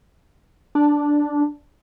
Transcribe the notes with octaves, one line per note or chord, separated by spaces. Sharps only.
D4